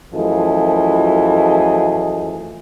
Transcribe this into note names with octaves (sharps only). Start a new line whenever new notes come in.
F#2 E3 F3 A3 G#4 D#5